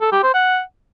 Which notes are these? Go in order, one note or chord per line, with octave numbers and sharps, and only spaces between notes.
A4
G4
C5
F#5